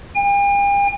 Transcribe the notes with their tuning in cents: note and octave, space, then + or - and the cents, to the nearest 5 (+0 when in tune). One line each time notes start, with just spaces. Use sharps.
G5 +45